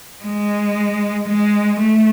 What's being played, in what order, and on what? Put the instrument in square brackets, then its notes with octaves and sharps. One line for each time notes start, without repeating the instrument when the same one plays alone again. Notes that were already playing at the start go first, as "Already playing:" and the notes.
[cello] G#3
G#3
A3